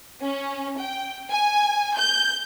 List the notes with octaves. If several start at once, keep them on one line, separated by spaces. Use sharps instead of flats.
C#4
G5
G#5
G6